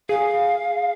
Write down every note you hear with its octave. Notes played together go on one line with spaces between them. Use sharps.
G#4 F5